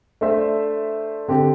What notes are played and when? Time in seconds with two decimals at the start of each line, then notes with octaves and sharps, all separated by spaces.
0.21 A3 D4 C5 E5
1.28 D3 C4 G4